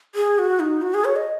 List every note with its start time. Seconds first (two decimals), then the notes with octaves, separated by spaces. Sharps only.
0.15 G#4
0.38 F#4
0.60 D#4
0.82 F#4
0.94 G#4
1.05 C#5
1.16 D#5